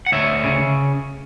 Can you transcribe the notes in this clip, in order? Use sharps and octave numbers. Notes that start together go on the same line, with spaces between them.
F#5
D2 C#5 E5
C#3